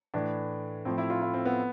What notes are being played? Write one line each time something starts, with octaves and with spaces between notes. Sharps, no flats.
A2 E3 D4
A2 F3 C4
E4
F4
E4
C4
B3